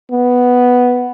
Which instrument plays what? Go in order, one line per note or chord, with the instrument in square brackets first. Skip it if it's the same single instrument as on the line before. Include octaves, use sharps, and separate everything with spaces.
[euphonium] B3